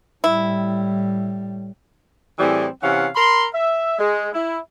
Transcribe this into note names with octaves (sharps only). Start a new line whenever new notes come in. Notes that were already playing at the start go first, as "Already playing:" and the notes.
A2 G3 E4
A2 E3 G3 C4 G#4
C3 E3 C#4 F5 F#5
A#4 B5 C6
E5
G#3
E4